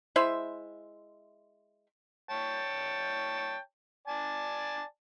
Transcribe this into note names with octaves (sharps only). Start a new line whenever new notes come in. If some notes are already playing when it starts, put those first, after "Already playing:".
G#3 E4 C5 E5
C#5 G5 A5
D5 G#5 A5